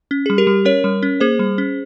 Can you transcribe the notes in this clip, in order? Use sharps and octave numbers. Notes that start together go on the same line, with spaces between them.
C#4
G3 G#4
G4 A#4
G3
C#4 A#4 C#5
G3
C#4
A#3 G#4 C5
G3
C#4